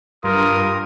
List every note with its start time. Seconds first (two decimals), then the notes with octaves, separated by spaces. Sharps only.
0.24 G2 F4 A#4 D#6